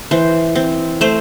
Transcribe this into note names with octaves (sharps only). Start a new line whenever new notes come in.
E3 C5
C4
A3 C5